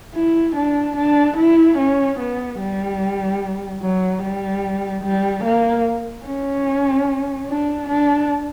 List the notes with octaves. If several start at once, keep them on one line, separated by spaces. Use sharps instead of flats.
E4
D4
D4
E4
C#4
B3
G3
F#3
G3
G3
A#3
C#4
D4
D4